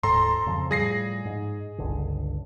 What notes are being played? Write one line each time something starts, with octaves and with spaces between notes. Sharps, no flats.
D1 G#2 A4 A#5 C6
F2 C#3 F3
A2 F3 G3 G#4 A#6 C7
G#2
G1 C#2 D3